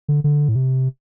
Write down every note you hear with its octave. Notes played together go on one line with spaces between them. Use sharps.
D3
D3
A2
C3